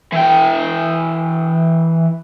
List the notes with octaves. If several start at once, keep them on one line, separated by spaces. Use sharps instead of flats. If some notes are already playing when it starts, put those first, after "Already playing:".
E3 G5